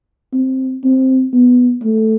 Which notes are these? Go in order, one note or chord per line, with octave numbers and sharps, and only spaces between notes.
C4
C4
B3
A3